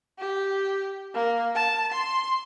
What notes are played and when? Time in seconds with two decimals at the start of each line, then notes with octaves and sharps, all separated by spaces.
0.19 G4
1.14 A#3
1.55 A5
1.92 C6